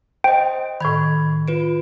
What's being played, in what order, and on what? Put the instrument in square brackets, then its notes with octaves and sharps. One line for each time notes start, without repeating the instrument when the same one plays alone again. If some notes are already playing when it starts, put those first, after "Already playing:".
[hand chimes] C5 D#5 [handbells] G5
[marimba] A2 D#3 [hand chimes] B5 G#6
[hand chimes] F4 B4 D7